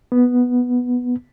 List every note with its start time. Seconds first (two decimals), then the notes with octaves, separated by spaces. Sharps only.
0.12 B3